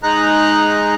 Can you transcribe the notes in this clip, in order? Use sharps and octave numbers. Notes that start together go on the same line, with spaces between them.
G#3 D#4 A#5 F#6